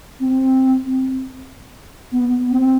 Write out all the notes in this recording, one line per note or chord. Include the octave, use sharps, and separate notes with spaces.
C4
B3
C4